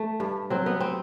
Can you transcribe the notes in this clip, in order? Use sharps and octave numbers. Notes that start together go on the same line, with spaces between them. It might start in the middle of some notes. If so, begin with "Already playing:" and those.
Already playing: A3
G2
F#3 C4
B3
C4